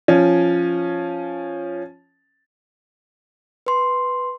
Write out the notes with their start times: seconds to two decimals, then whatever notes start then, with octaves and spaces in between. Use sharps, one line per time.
0.08 F3 C#4
3.66 B4 C6